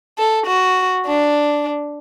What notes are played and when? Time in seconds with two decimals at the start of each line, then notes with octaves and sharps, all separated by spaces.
0.19 A4
0.47 F#4
1.06 D4